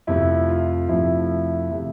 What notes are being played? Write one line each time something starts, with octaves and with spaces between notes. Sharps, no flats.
F2 C3 F3 A3 E4
F4
F2 C3 F3 A3 E4
C3 F3 A3